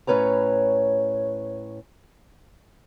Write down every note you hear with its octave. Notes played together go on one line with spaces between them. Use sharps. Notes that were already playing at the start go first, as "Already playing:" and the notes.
A2 C#4 B4 C#5 A#5